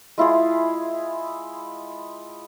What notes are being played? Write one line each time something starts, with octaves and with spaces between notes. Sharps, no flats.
G#3 E4 F4 G#4